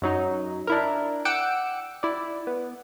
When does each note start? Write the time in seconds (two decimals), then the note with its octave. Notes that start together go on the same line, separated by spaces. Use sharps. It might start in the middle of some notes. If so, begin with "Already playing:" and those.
0.02 F#2 F#3 D#4
0.67 D4 E4 A#4
1.25 F#5 G5 D6 E6 C#7 D7
2.03 E4 D5
2.47 B3